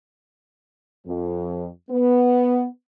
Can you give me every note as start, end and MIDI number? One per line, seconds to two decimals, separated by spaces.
1.07 1.67 41
1.91 2.67 59